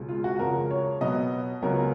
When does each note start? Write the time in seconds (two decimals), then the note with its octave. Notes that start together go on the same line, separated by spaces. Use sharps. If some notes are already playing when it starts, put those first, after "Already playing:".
Already playing: C#2 B2 G#3
0.09 F4
0.24 F#4
0.39 F2 C#3 G#3 A#4
0.71 C#5
1.01 B2 F#3 B3 D#5
1.62 C#2 C#3 F#3 B3 A#4